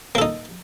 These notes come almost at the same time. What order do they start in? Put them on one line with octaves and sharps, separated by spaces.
A#3 A4 D#4